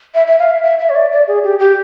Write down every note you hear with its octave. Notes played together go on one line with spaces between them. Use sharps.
E5
E5
F5
E5
E5
E5
C#5
D5
D5
G#4
G4
G4